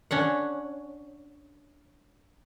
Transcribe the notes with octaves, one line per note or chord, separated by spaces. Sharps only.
C#4 D4 F#5